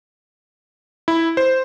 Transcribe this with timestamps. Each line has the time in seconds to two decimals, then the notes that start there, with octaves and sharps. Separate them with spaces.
1.08 E4
1.37 C5